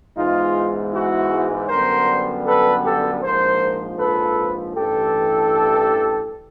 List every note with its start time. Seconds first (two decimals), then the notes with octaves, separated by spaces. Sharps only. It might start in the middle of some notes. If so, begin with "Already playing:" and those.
0.16 G#2 E3 G#3 B3 D#4 F4
0.93 E4 F#4
1.69 F#2 D3 G3 B3 A#4 C5
2.46 A4 B4
2.84 G4 A4
3.22 A#1 G#2 F3 A#4 C5
3.99 A4 B4
4.76 A1 G2 E3 G4 A4